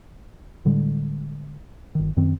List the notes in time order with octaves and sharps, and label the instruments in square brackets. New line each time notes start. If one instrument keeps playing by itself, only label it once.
[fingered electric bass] A2 D3 G3 G#3
G1 D#3
F#2 D#3 C4